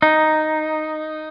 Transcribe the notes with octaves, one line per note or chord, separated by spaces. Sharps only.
D#4